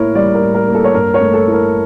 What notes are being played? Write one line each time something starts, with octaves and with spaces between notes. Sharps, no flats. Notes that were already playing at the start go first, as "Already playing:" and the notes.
Already playing: A2 A#3 E4 A#4 C#5
G3 D5
A#4
A2
A#4
A#3
A4
C#5
G2 A#4
C#5
A3
A4
E4
A#4